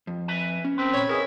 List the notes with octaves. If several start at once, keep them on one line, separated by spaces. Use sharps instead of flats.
F2
B4 E5 G#5
C#4
C4 D#4 A#4 B4
C#5 B5
E4 G#4 A#4 B4 D#5